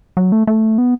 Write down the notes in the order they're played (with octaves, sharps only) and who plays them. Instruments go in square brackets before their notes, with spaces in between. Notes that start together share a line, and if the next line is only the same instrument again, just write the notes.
[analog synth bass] F#3
A3
A3
B3